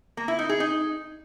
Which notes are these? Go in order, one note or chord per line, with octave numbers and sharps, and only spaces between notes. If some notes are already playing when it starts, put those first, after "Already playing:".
A#3
E4
D#4
G#4
D#4